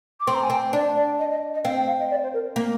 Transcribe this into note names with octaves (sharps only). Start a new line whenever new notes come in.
D6
C4 C6
A#5
G#5
C4 G5
D4 D5
D5
D#5
D#5
D#5
C4 F5
G5
F5
D#5
D5
C5
A#4
A#3